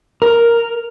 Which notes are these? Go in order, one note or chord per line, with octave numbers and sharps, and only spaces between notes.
A#4